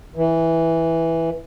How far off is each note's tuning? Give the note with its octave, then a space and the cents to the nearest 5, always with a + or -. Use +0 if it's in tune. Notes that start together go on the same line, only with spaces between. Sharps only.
E3 -5